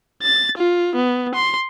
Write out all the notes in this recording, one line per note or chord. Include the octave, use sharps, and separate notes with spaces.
A6
F4
B3
C6